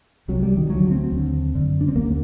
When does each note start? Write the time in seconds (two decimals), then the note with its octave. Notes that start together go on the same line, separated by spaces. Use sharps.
0.28 C2 C3 F#3
0.43 G3
0.57 D#3
0.70 D2 D3 F#3
0.91 C4
1.12 D#2 D3
1.55 F#2 D3
1.81 D4
1.88 C4
1.96 D#2 A#3
2.01 D3